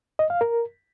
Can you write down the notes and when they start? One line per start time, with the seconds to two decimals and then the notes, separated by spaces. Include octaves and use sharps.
0.19 D#5
0.30 F5
0.41 A#4